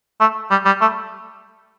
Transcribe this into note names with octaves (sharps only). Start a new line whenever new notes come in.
A3
G3
G3
A3